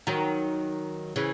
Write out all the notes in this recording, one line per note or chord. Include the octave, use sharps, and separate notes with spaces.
D#3 F#3
C#3 E3